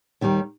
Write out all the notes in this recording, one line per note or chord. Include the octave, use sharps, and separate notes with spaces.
D#2 D#3 G3